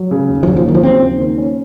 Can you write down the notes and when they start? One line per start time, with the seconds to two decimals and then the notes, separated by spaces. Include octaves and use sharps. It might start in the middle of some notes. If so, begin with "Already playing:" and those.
Already playing: F#3
0.11 C#3
0.29 D#2
0.43 F3
0.46 D#2 F#3
0.56 F3
0.64 D#3 F#3
0.75 F3
0.83 C#3 C4
1.02 D#2
1.19 D#3
1.38 C#4